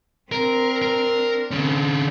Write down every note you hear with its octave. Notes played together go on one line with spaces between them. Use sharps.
C4 D4 A#4
A#4
D3 C4 C#4